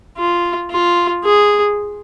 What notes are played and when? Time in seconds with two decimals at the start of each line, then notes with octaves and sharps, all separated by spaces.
0.17 F4
0.70 F4
1.24 G#4